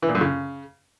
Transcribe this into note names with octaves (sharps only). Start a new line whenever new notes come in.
E3
A#2
F#2
C#3